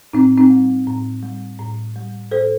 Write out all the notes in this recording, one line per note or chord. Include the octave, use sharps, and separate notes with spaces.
A2 C4 D#4
C4 D#4
G3
A2
G3
A2
G3
A2 A4 C5